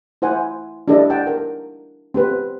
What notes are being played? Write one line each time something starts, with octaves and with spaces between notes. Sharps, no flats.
E4 C5 F#5 G#5
D4 E4 G4 A4 D5 D#5
F#5 G5 A5
A#4
C4 G4 B4 C5